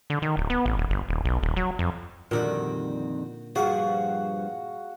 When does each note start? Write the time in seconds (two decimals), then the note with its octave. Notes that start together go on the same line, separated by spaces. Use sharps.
0.10 D3
0.22 D#3
0.37 D1
0.50 B3
0.66 A1
0.78 D#1
0.90 G1
1.09 D#1
1.25 B1
1.43 D#1
1.56 F#3
1.79 F2
2.31 F2 A#2 D3 D#3 G3 F#4 G5
3.56 G2 F3 F#4 G#4 F5 F#5